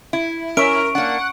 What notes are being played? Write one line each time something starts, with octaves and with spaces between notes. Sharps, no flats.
E4
C#4 A#4 E5 C#6 D7
A#3 D4 F#5